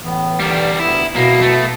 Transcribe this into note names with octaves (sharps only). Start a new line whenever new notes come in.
A2 E3 B3
D3 G3 G4 A#4
D2 B3 E4
B1 B2 A#3 B3 E4 A#5
A3 B3 A5